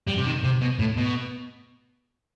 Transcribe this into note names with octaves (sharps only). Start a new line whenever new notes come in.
G3
C3
D#3
C3
B2
A2
B2